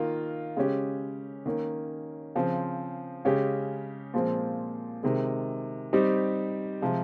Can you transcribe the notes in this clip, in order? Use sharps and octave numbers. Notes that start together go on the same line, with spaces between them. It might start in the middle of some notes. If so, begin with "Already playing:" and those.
Already playing: D#3 A#3 F4
C#3 G#3 C#4 G4
D#3 A#3 C#4
C#3 F3 C4
C#3 G#3 C#4 G4
A#2 F3 G#3 C4
C3 D#3 G#3
G3 C4 D#4 G4
C3 F3 G#3